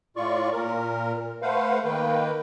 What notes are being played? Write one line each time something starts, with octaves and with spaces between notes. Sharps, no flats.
A2 F4 D5 C#6
A#2 A#4
A3 B4 C5 F5 F#5
D#3 A#3 B4 G5